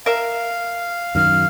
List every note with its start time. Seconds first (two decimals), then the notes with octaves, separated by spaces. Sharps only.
0.06 A#4 E5 F5
1.15 F#2 D#3 F#3 F6